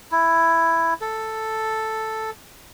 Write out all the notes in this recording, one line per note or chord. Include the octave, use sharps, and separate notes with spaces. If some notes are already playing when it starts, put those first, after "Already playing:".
E4
A4